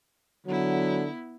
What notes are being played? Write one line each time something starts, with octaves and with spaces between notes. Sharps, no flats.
D3 F#3 B3 E4